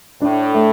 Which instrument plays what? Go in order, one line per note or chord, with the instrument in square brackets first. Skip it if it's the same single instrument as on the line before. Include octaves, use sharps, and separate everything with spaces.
[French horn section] A2 [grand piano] D4
[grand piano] A3